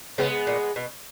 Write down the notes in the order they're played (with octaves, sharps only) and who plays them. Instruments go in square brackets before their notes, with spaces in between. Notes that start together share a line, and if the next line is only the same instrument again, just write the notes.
[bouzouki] C#3 [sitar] G#3 B3
[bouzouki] A#2
B2